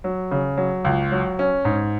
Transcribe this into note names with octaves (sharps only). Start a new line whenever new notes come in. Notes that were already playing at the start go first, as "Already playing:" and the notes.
F#3
C#3
F#3
C#2
F#3
C#4
G#2